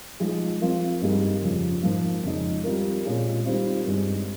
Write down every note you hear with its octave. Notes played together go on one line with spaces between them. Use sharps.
F3 G#3 D#4 G#4
F3 C4 F4 A#4
G2 G3 A#3 D#4 G#4
F2 C#3 F3
G#2 F3 A#3 F4
F2 C#3 G#3 D#4
G3 C4 F4 A#4
A#2 G#3 C#4 F4 G#4
D#3 G3 C4 F4 C5
G2 D#3 G#3